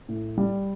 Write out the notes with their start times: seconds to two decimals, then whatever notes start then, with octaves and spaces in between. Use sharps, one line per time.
0.09 A2
0.38 G3